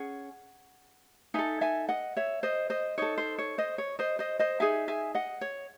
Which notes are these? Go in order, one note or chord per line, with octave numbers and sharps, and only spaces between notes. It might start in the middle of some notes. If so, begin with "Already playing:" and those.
Already playing: C#4 G#4 F#5
D#4 A4 E5 G#5
E5 G#5
D#5 F#5
C#5 E5
C5 D#5
C5 D#5
D#4 A4 C#5
C5
C#5
C5 D#5
C#5
C5 D#5
C5 D#5
C5 D#5
D#4 G#4 E5 G#5
E5 G#5
D#5 F#5
C#5